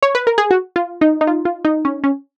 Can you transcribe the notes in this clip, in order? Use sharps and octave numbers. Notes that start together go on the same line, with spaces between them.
C#5
B4
A#4
G#4
F#4
F4
D#4
D#4
F4
F4
D#4
C#4
C#4